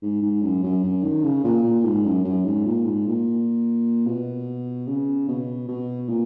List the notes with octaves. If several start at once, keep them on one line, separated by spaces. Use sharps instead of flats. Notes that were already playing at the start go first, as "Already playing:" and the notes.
G#2
G#2
F#2
F#2
F#2
D#3
C#3
A#2
A#2
G#2
F#2
F#2
G#2
A#2
G#2
A#2
B2
C#3
B2
B2
A#2